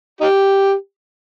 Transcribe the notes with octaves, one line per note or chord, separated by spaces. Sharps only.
D#4 G4